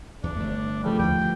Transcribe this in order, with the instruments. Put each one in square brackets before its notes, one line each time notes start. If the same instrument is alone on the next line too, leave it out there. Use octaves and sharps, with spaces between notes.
[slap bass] E2 [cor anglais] D4
[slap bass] G1 A3
[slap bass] C#3 [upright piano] F3 A3 [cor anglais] G3
[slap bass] D#2 D3 E3 [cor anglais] G5
[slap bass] D2 G2